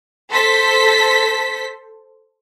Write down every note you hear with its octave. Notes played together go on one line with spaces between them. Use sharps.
A4 C5 B6